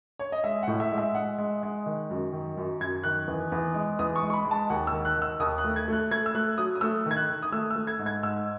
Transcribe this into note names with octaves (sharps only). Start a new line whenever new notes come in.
C#5
D#5
G#3 E5
A2 F#5
E5
G#3
E5
G#3 F#5
G#3
G#3
D#3
F#2
D#3
F#2
F#2 G#6
D#3 F#6
E2
E2
G#3
E2 D#6
C#6
G#3
C#6
B5
G#3
A5
D#2 F#5
E6
D#3
F#6
D#3 E6
D#2 D#6
F#6
A3
G#6
A3 F#6
A3 G#6
E6
A3 F#6
F#3 D#6
D#6
A3 E6
D#3 G#6
F#6
D#3
D#6
A3 E6
E6
A3
G#6
G#2
G#6
G#2 E6